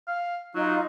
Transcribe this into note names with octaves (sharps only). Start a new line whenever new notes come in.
F5
F#3 D#4 F4